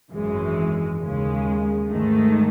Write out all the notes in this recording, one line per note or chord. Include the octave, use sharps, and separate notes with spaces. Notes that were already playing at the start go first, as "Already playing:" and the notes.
G#1 F#2 E3 G#3
D#2 C#3 G#3
G#2 D#3 A3